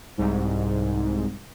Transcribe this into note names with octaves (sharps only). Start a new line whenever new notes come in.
C2 G#2